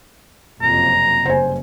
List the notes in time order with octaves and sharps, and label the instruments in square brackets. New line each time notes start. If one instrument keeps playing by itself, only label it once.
[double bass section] F#1 F2 C3 [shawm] A#5
[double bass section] F#1 G2 [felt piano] C5 G#5